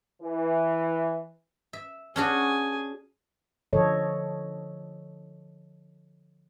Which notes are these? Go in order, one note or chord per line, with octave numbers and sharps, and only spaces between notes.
E3
E5
C#4 D4 F#4 G#4 G#5
D3 F3 A4 C#5 D#5